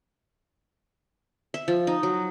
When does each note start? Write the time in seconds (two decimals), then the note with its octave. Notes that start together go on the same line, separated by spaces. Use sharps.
1.54 E5
1.68 F3
1.87 D#4
2.03 F#3